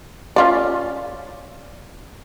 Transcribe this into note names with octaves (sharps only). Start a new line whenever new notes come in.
C#4 F4 D5